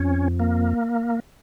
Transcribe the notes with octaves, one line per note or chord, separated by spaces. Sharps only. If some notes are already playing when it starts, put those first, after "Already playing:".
Already playing: F2 C#4
A#3